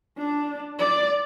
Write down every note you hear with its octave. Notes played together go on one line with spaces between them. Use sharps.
D4
D5